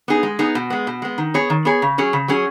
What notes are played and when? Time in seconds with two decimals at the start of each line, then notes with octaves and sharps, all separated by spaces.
0.08 B3 D#4 G#4
0.23 G#3
0.39 B3 D#4 G#4
0.55 B2
0.70 G#3 B3
0.87 B2
1.02 G#3 B3
1.18 D#3
1.34 B3 G#4 C#5
1.50 D#3
1.65 B3 G#4 C#5
1.82 C#3
1.98 F#3 C#4 G#4 C#5
2.13 C#3
2.28 F#3 C#4 G#4 C#5